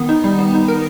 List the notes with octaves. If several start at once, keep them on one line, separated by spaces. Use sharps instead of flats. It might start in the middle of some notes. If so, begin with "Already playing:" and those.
Already playing: D#3 B3
D#4
G3
B3
D#4
A#4